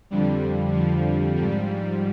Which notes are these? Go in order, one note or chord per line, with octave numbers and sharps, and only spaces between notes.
F2 D3 F3 G3
F3
G#2 F3 G3